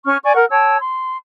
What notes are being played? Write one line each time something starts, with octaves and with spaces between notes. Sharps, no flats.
C#4 C#6 F6
D5 G#5 C#6
A#4 F#5
C#5 G5 A5 E6
C6